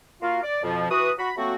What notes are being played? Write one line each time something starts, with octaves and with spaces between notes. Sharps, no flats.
A#3 F4 F#4 F5
D5
F2 B2 F3
E3 F#4 B4 D#6
F#4 B5
F#3 A3 A#3 C4 F#4